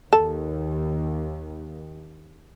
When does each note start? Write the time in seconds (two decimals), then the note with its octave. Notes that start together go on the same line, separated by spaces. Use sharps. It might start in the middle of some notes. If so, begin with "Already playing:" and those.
0.13 D#2 A4